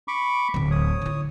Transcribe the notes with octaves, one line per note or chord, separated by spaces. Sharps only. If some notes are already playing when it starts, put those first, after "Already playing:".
B5 C#6 D6
D1 D3
C#5 D#6
D3 E4